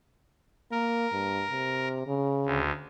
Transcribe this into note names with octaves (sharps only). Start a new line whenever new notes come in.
A#3 A#4
G2
C3
C#3
D2